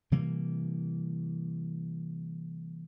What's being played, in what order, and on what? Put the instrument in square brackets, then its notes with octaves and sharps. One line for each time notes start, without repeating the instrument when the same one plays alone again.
[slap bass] C3 E3 G3 A#3